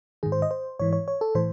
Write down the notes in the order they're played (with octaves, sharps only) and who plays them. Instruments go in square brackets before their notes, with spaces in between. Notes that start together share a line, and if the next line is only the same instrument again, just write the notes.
[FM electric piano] G#2 D#3 G#4
C5
D#5
C5
G#2 E3 C#5
C#5
C#5
A4
A2 E3 C5